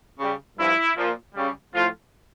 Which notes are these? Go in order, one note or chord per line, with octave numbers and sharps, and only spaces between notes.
C#3 G3
G2 F3 E4
A#2 F3
C#3 G3
A2 F3 F4